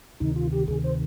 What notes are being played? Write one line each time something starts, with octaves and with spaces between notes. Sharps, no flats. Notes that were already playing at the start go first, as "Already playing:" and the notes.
D2 C3 D#3 D#4
F4
G4
D2 C3 D#3 G#4
C5